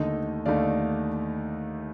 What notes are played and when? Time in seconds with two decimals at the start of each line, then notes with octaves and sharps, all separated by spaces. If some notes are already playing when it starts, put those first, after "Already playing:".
Already playing: D#2 D3 A3 D#4 D#5
0.46 D#2 D3 A3 D#4 D5 F5